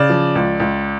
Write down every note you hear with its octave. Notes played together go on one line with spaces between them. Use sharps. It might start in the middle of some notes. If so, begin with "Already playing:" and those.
Already playing: C#3 D5
F3
C#2
C#2